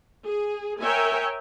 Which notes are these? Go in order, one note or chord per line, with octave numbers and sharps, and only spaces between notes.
G#4
A#4 C#5 E5 G5 G#5